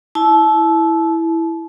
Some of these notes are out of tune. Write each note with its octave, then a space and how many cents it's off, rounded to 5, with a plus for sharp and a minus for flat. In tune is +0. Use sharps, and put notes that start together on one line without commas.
E4 +0 A5 -30